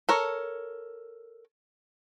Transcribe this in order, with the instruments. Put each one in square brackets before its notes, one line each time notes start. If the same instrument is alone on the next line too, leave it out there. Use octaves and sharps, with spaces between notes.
[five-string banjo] A4 A#4 C#5